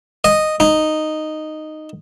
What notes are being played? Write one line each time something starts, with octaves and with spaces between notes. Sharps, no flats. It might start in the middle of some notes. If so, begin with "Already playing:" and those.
D#5
D#4